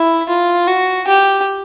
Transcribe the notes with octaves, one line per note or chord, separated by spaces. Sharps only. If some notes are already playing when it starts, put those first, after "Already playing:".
Already playing: E4
F4
F#4
G4